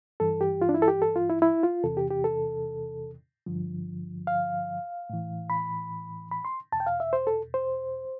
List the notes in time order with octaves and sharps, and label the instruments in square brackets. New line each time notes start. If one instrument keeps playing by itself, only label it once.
[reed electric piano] G2 E3 A4
G4
F4
D4
E4
A4
G4
A4
F4
E4
E4
F4
E2 C3 E3 A4
G4
G4
A4
G2 D3 F3
F5
A2 E3
B5
B5
C6
E2 B2 A5
G5
F5
E5
C5
A4
C5